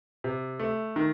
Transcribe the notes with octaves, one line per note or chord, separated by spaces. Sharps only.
C3
A3
D#3